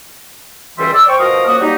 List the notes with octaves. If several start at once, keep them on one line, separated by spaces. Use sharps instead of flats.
C#2 F#2 E3 G3 E5 C6
D5 E6
C5 G5 C#6
B2 F3 F#4 A#4 F5 D#6
F#2 F3 A#3 F#4 D#6
F#3 G3 A#3 D#4